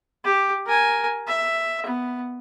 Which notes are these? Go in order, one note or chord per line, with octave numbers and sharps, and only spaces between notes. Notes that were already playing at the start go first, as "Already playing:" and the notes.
G4
A#4 G#5
E5
B3